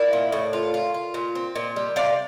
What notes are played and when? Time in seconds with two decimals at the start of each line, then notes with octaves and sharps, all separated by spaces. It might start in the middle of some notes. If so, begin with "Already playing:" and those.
Already playing: E4 A#4 D5
0.13 A#2
0.32 A2
0.53 F4
0.74 F4
0.94 F4
1.14 A#2
1.35 C4
1.56 A#2
1.76 G3
1.96 C3 D5 F5